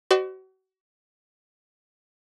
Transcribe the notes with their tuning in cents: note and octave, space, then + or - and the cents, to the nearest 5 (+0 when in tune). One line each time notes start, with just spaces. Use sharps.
F#4 +35 C5 -25 D#5 -45